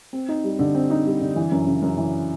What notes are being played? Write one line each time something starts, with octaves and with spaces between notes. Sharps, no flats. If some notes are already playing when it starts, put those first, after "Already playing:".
C4
D#4
G3
D3
C4
D#4
G3
D3
E3
F#2
C#3
F#2
E3